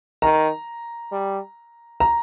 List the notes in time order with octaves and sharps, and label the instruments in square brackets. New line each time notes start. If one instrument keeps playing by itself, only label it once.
[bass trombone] D#3 [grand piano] A#5
[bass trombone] G3
[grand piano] A#5